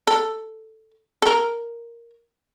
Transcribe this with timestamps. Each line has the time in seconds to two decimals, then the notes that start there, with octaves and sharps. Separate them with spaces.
0.07 A4
1.22 A4
1.27 A#4